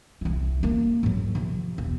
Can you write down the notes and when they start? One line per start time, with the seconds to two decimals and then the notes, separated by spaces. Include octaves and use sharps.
0.21 C2 E3
0.63 G#3 A#3
1.03 G#2 F#3
1.35 C3 F3
1.78 E1